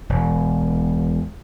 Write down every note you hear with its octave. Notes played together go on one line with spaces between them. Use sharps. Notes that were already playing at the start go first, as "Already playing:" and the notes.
E1